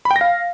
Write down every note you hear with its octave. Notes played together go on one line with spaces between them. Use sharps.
B5
G5
A#6
F5